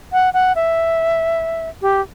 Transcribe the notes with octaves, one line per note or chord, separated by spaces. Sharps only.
F#5
F#5
E5
G4